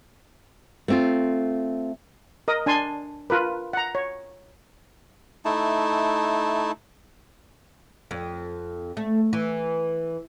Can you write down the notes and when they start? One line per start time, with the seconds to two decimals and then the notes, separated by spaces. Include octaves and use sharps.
0.88 A3 C4 F4
2.48 A#4 D#5 D#6
2.66 D4 G#5 A5 C6
3.30 F4 A#4 B4
3.73 F#5 A#5
3.95 C#5
5.45 A3 D#4 E4 A5
8.11 F2
8.97 A3
9.33 E3